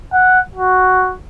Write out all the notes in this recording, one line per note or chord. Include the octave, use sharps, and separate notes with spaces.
F#5
F#4